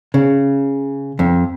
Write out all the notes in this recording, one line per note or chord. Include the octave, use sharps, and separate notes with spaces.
C#3
F2